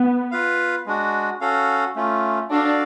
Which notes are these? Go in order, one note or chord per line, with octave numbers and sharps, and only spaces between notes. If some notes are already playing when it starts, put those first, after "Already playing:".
Already playing: B3
F4 B4 F5
G#3 D4 F#4
C#4 F#4 A4 F5
A3 C#4 F4
D4 F#4 A4 D5 F5